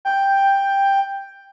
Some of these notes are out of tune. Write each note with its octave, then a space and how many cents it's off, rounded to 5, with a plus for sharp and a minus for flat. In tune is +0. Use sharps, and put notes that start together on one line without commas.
G5 +5